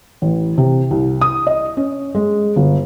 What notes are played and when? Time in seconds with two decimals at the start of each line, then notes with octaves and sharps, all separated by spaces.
0.22 A1
0.58 C3
0.91 C2
1.21 D#6
1.47 D#5
1.77 C#4
2.15 G#3
2.56 G1